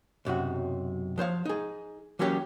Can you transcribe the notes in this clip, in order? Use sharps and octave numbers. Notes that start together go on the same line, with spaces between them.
B1 F#2 C3 F#4
F3 C5 C#5 F5
D#4 G#4
E3 F#3 A#3 C#4 G4 C#5